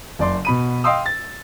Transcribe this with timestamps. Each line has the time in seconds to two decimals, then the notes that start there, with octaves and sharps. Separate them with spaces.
0.19 F#1 D5 C6
0.45 B2 B5 D#7
0.84 D#5 F5 G5 C6 D#6 E6
1.06 A6